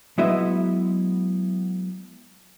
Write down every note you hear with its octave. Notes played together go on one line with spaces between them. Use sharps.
F#3 G#3 B3 E4 D#5 E5